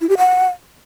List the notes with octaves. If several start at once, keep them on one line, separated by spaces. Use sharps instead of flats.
E4
G4
F#5